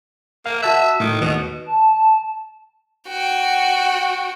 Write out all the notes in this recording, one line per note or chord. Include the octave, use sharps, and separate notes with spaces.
A#3 F5
F#4 E5 A5 F#6
A2 D#3
D#2 B2
A5
F#4 G5